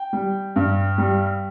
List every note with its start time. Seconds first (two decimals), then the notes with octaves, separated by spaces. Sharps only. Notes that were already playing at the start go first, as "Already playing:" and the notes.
Already playing: G5
0.13 G3
0.56 G2
0.98 G3